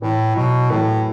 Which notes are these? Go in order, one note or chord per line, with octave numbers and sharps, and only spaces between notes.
A2 E3
B2 F#3
A2 E3 A3